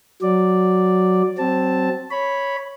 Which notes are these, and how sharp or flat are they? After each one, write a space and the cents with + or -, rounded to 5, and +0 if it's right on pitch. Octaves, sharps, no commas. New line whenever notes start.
F#3 +0 D5 +0
F#3 +30 C4 +0 A5 +0
C#5 +0 B5 -5